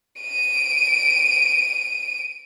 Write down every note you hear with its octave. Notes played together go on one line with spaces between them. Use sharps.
D7 D#7